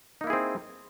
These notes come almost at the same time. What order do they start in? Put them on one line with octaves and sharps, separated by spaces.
D#4 A#3 E4 G#4 C4